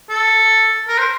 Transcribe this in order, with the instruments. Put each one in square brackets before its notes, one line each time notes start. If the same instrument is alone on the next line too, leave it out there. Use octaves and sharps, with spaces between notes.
[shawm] A4
A#4
C5